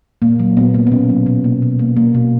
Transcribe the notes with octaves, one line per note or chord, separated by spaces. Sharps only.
A#2 A#3
F#3
A#2 B3
A#3
B3
B2 C#4
F#3
B2
A#3
B2
A#3
A#3
B2